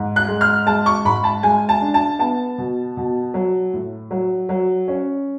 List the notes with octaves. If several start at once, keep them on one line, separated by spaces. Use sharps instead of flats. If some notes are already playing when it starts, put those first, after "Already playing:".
Already playing: G#2
F#6
G#3
F6
G#3 A5
C#6
G#2 B5
A5
G#3 G#5
A5
D4
A5
B3 A5
B2
B2
F#3
A2
F#3
F#3
C#4